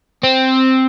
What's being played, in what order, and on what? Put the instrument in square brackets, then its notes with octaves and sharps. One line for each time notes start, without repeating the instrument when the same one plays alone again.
[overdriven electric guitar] C4